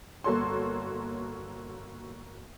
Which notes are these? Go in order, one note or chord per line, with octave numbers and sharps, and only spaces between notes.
G1 A#3 F#4 A4 C#5 C6